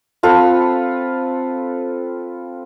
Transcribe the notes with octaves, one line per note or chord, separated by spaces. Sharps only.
C4 F4 A4 B4